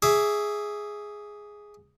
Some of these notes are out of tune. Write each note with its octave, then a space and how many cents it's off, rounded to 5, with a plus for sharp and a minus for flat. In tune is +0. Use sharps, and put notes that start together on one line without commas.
G#4 +0 E5 +0 D6 -30